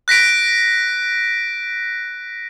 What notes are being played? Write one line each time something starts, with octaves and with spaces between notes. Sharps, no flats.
F#6 A#6 B6 D7